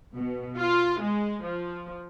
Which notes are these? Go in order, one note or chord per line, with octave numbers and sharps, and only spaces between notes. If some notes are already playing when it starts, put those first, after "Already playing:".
B2
F4
G#3
F3